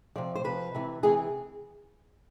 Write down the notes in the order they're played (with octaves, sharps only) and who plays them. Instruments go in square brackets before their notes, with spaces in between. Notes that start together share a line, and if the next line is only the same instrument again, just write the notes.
[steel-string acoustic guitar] C3 F3 D5
C5
C3 F3 B4
C3 E3
C3 E3 G#4